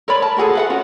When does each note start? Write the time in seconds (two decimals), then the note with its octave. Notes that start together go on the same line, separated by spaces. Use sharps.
0.08 A#4 C#5 D5 B5
0.22 A5
0.37 F4 F#4 G#4 A4
0.55 B4 F5 F#5
0.70 C#4 F4 F#4